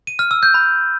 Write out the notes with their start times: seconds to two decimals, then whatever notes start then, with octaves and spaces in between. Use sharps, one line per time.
0.07 D#7
0.19 F6
0.31 E6
0.43 G6
0.54 B5